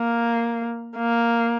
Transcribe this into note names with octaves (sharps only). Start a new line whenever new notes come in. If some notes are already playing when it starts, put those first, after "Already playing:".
Already playing: A#3
A#3